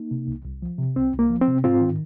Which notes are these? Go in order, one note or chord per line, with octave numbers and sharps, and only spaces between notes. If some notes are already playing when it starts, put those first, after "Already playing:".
Already playing: A#3 D#4
C3
C2
C2
F3
C3
C2 C4
C2
A#3
F3
C4
C3
G#2 C4 F4
D#3